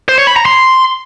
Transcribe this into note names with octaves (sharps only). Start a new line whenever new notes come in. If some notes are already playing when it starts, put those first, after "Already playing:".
C5
C#5
B5
A#5
C6